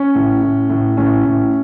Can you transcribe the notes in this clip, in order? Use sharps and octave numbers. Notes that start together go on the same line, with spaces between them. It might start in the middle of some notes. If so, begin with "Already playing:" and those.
Already playing: C#4
A2
A2
A2
A2 C#4
A2